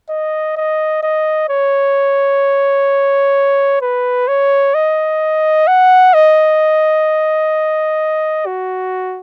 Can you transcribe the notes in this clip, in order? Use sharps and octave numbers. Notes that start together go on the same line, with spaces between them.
D#5
D#5
D#5
C#5
B4
C#5
D#5
F#5
D#5
F#4